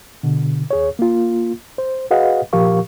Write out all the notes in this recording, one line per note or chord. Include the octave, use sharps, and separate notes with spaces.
B2 D3
D#2 G#4 C#5
A#3 F4
C5
F#4 G#4 B4 D#5 F5 F#5
A#2 F3 G4 A#4 F5 C#6